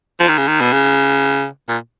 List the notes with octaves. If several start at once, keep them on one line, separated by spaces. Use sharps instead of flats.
F3
D#3
C#3
D#3
B2
C#3
A#2